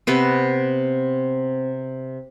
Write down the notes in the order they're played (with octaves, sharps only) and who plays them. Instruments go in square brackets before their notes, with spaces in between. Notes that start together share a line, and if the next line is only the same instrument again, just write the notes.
[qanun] C3 B3 C4